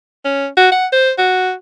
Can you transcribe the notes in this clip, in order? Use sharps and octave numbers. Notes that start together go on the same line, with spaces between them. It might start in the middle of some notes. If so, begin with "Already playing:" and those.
C#4
F#4
F#5
C5
F#4